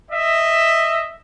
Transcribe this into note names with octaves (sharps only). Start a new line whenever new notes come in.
D#5 E5